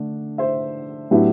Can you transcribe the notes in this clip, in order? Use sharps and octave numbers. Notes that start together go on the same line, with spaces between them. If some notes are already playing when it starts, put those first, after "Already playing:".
Already playing: D3 A3 D4
C5 E5
A2 F#3 B3 D4 E4 G4